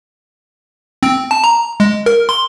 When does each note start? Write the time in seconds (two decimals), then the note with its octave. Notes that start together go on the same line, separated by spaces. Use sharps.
1.03 C4
1.31 A5
1.44 A#5
1.80 G#3
2.06 A#4
2.29 C6